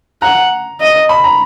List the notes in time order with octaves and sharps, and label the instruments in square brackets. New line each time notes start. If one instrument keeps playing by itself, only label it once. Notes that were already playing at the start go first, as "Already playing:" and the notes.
[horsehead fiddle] F#5 [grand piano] A#5
[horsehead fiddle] D#5
[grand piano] B5
A#5